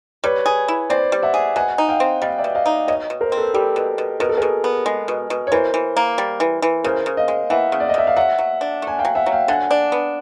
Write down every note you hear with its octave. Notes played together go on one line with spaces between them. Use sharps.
G3 B4 C#5
G#4
E4
C4 C5 D5
G3
E5 F#5
G#4
B2 F#5 G#5
D#4
F5 G5
C4
G3 D#5 F5
D5 E5
B2
D#5 F5
D#4
B2 C#5 D#5
B2
A#4 C5
C4
A4 B4
G3 G4 A4
B2
B2
B2 A#4
A4
B2 G#4 A#4
B3
G#3
B2
B2
C#5
E3 A#4 C5
E3
A#3
G3
E3
E3
C#3 A#4 C5
C#3
D#5 F5
G#3
E3 E5 F#5
C#3
D5
D#5
C#3 E5
F5
F#3 E5 F#5
F#3
D4
A3 G#5
F5 G5
F#3
E5 F#5
F#3
F5 G5
D3 F#5 G#5
D4
B3